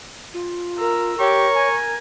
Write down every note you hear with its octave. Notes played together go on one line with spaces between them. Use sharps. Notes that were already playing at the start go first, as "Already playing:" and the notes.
F4
A#4 E6
G4 A#4 C#5 C#6
G#5